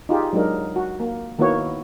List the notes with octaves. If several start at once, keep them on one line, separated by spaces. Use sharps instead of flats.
D#4 F4 G4 G#4
F#3 G#3 D4 D#4 A#4
F#4
A#3
D#3 A#3 B3 E4 F#4 C#5